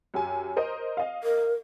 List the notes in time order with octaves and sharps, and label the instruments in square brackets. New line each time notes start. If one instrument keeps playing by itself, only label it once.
[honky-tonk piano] F#2 G4 G#5
A#4 C5 D#5
D#5 F5
[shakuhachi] A#4